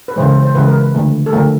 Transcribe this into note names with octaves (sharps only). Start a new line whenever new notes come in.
B4
C#3 E3 G#3 C5
C5
C5
C#3 E3 G#3 B4
A#4
B4
D3 F3 A3
A4
D3 F3 A3 A#4